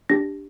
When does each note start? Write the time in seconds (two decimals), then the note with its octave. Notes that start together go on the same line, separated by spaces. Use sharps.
0.10 D4 G4 A#6